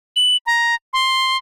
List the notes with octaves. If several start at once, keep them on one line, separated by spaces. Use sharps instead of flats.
F#7
A#5
C6